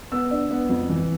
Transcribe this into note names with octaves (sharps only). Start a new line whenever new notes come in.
B3 E6
D4
B3
F2
E3